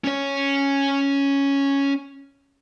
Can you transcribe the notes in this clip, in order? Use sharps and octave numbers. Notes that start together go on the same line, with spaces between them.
C#4 C#5